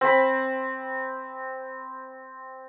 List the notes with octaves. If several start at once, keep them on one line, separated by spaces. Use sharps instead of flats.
C4 B5